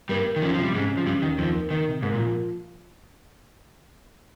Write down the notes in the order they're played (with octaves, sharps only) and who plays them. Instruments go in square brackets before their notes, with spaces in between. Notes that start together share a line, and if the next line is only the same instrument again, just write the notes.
[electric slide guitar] G2 G3 [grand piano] A#3
[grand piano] A#3
[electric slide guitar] D#3
[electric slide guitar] F2 F3 [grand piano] C#4
[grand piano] C3 [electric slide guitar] F3
[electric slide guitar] G3
[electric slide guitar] G#2 G#3 [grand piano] C#3
[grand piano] C#4
[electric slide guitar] F3
[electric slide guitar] G2 G3 [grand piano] C#4
[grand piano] D#2 [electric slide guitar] D#3
[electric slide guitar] F2 F3 [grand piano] D#4
[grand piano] A#3
[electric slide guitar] D#3 [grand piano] A#3
[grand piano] C3
[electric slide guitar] G#2 [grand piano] A#3
[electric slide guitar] A#2
[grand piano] F3